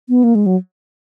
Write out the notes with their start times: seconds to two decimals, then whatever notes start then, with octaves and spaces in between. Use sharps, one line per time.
0.09 B3
0.24 A#3
0.35 G#3
0.46 F#3